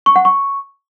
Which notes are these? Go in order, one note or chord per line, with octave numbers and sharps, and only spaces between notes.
C#6
F#5
C#6